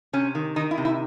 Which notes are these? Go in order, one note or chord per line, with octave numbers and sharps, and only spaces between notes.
C3 C#4
D#3
D#3 D#4
E4
C3
E4